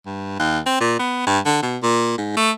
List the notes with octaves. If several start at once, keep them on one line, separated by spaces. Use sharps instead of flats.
G2
D#2
C4
A#2
B3
G2
D3
B2
A#2
G#2
A3